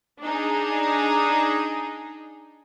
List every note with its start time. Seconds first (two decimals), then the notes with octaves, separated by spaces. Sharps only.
0.22 D4 D#4 G#4